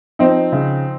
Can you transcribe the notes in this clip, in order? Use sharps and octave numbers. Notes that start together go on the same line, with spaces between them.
F3 C4 D#4
C#3